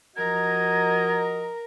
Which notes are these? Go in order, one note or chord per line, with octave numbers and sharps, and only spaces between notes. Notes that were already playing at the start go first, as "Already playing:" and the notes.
F3 F#4 A#4 D#5 A#5 G#6